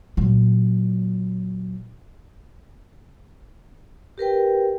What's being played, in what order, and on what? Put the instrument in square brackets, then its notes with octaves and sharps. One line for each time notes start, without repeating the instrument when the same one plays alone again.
[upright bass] A#2 F#3
[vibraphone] G4 A#4 B4 G5